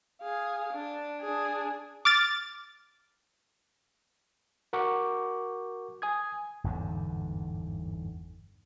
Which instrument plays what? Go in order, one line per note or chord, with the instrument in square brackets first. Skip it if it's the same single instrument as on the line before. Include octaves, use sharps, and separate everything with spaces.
[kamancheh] G#4 F5
D4
D4 G#4
[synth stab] D6 F6 A6
[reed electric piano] F#4 A#4 F#5 C#6 D6
G#5 D#6 G#6
[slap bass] G1 E2 G#2 D3